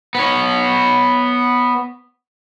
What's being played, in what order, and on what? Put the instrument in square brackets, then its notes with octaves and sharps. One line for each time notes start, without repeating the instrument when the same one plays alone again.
[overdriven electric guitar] B3 C#5